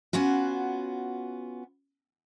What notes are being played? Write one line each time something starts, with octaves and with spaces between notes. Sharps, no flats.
B3 C#4 F4 F#4